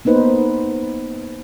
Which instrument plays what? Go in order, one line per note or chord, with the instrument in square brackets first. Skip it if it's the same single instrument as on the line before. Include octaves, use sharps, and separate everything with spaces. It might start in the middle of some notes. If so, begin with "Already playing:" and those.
[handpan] A#3 B3 D#4 B4 C5